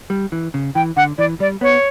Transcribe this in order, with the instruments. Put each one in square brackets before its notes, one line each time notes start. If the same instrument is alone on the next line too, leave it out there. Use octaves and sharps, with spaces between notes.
[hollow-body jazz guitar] G3
E3
C#3
[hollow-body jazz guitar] E3 [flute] G5
[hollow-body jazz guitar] D3 [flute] F#5
[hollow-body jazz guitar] E3 [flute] D5
[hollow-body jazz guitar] G3 [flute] D5
[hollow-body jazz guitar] B3 [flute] C#5